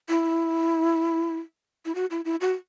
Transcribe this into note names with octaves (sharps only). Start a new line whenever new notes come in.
E4
E4
F#4
E4
E4
F#4